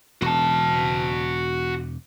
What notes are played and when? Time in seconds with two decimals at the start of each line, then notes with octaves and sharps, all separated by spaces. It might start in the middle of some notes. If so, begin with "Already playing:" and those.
0.22 E1 F#4 A5